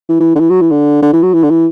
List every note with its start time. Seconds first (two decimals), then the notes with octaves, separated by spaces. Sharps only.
0.09 E3
0.20 E3
0.36 D3
0.40 E3
0.50 F#3
0.61 E3
0.71 D3
1.03 D3
1.13 E3
1.23 F#3
1.34 E3
1.43 D3
1.50 E3